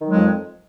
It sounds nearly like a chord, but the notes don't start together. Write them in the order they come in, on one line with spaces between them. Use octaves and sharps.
D#3 F#3 G#3 F2